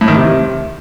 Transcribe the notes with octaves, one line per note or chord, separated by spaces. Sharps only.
A2
D#3
C3